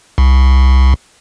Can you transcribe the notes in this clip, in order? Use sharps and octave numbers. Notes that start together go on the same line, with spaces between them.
C2